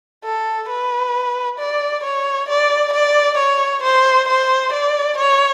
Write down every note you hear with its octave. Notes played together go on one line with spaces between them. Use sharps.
A4
B4
D5
C#5
D5
D5
C#5
C5
C5
D5
C#5